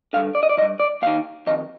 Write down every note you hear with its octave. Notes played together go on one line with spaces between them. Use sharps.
G2 D3 F5
D5
D#5
D5
D#3 D#5
G2
D5
D#2 D#3 F5
F2 D#3 D#5